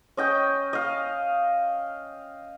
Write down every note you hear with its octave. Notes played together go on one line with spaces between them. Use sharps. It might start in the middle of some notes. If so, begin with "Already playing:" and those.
C#4 D#5 G5
D#5 F5